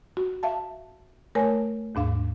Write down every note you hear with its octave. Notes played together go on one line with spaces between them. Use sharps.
F#4
E5 F5 A5
A3 A#4 C#5 G#5
D#2 G#2 D4 F5